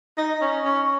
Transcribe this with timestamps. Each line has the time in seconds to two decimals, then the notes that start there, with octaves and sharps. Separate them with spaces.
0.18 D#4
0.41 C#4
0.65 C#4